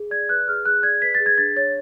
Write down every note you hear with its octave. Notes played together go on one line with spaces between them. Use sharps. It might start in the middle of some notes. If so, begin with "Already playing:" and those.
Already playing: G#4
D5 G#6
B4 F#6
G#4 F6
G#4 F#6
D5 G#6
B4 B6
G#4 A6
G#6
D4 A6
C#5 A6